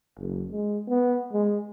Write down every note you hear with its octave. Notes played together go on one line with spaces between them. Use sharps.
F#1
G#3
B3
G#3